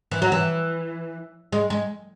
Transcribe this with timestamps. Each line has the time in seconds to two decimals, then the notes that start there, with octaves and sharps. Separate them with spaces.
0.11 E3
0.22 F#3
0.32 E3
1.53 G#3
1.70 G#3